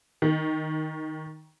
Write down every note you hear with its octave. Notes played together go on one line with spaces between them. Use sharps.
D#3